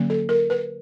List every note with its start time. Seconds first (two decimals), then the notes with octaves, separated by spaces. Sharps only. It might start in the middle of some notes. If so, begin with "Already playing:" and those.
Already playing: D3 F#3 A#3 C#4
0.10 A4
0.29 A#4
0.50 B4